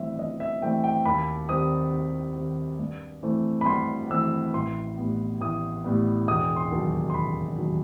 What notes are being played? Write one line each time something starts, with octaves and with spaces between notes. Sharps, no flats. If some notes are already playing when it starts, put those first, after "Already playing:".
Already playing: G1 G2 E3 A3 C4 E5
G1 D#5
E5
G2 E3 A3 C4 G5
G5
D#2 B5
D#3 G3 C4 D#6
D#2
D#3 G3 C4
G2
E3 A3 C4
B5
G2 C6
E3 A3 C4 E6
A1 C6
A2 G3 B3
A1 D#6
A2 G3 B3
E1 D#6
C6
D#2 D#3 F#3
C6
E1 B5
D#2 D#3 F#3